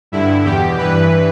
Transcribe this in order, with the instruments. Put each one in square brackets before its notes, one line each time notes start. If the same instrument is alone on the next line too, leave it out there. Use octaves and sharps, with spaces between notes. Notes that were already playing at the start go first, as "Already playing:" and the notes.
[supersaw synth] G2 D3 E4
E2 B2 G4
G2 E3 B4